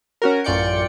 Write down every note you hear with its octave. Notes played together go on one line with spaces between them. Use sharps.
C#4 F#4 A#4
A1 F#2 F4 D5 G5 C#7